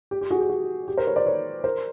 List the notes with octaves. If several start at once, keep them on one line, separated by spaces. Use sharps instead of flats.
G4
G4
F#4 G#4
G4
F#4
G4
A#4 C5
B4 C#5
C5 D5
B4 C#5
A#4 C5